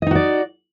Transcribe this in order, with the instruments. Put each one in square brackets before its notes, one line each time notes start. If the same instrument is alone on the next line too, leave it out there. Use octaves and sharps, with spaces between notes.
[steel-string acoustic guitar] D#5
D#4
F#4
D5